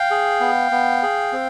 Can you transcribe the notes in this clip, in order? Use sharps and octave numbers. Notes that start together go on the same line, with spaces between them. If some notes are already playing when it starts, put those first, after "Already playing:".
Already playing: F5 G5
G#4
B3
B3
G#4
C4